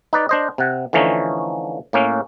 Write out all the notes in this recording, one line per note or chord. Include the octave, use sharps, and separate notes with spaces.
D#4 B4 D5
D4 C5 D#5
C3 F#5
D3 E3 F3 A3 C#4 D#4
A2 A#3 C#4